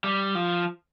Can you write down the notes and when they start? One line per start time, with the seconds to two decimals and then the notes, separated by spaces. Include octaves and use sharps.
0.04 G3
0.35 F3